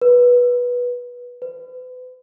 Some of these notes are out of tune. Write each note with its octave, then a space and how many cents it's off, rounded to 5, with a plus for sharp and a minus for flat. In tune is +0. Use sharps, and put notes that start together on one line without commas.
B4 -15
B4 +40